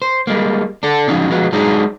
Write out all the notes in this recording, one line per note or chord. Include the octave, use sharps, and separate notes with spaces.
C5
G3 G#3 A#3
D4 A4
F3 F#3 C#4 D#4
F3 G#3 B3 F#4
F#3 G#3 D4 D#4 G#4